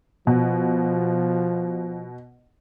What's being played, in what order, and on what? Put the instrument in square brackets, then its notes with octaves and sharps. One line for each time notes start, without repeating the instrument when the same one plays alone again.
[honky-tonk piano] B2 [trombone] F3